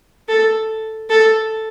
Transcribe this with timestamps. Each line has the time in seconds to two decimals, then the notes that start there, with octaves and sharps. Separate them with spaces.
0.28 A4
1.10 A4